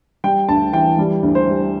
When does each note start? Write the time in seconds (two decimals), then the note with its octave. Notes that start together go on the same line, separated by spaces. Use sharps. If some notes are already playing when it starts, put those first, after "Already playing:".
0.24 G3 G5
0.49 D2 A5
0.73 E3 G5
0.98 G3
1.23 D2
1.35 C5
1.48 G3